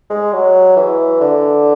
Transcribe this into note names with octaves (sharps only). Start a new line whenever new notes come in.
G#3
F#3
E3
D3